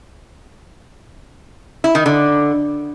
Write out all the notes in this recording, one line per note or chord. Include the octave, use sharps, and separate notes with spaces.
E4
D#3
D3